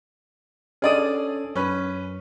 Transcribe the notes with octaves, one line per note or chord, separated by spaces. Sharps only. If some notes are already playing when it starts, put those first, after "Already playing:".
C#4 D4 G#4 A4 D5 D#6
F#2 C#4 B4